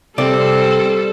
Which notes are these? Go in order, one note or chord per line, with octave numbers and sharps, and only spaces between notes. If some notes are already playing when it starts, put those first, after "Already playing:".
C3 G3 C4 A4 D5